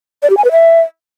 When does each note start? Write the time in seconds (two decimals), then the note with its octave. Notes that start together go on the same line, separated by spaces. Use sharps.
0.23 D5
0.30 G4
0.37 G#5
0.44 B4
0.52 E5